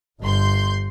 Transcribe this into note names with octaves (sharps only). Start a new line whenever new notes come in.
G1 C6 G6